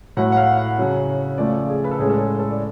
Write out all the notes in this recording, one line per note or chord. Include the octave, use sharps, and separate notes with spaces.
A2 F#3 A3 F#5
F#5
F5
F#5
C#3 F#3 C#4
C#3 F3 A3 C#4 D5
G#4
B4
A4
A2 G#3 C#4 G#4
A4
G#4
A4
D5